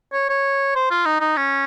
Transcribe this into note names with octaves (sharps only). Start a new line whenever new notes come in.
C#5
C#5
C5
F4
D#4
D#4
C#4